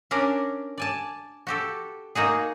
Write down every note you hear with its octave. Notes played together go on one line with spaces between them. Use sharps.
C#4 D4 A#4 D5
D5 G#5 A5
F#4 G4 A4
A#3 D#4 F#4 G#4